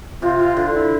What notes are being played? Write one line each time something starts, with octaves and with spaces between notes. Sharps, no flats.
C3 F4
F4
D3 F4
E4